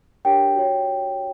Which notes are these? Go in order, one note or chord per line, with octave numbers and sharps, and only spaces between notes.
D4 G4 A#4 C#5 G5
F#4 C#5